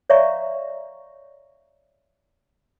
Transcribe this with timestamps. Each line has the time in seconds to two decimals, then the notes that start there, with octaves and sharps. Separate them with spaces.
0.10 C#5 D5 E5 F5 A#5 C#6